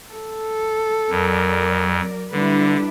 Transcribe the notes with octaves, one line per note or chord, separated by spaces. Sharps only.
A4
F2 F#3 A#4 D5
D3 G3 D4 E4 B4